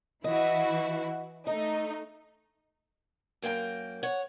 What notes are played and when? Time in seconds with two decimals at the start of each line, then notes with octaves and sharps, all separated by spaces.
0.24 E3 E4 F#4 D#5
1.47 A3 D#4 D#5
3.42 F#2 A#3 C4 G5 A#5
4.03 C#5 F#5